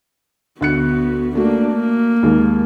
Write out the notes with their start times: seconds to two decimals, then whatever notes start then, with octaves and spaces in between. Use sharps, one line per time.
0.61 D2 B3 F#4 F#6 C#7
1.35 A3 A#3 D4 F#4
1.73 A#3
2.23 D#2 G#3